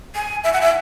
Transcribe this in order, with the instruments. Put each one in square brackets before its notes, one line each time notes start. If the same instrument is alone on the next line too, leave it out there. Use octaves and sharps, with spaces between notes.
[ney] G#5
E5
F#5
E5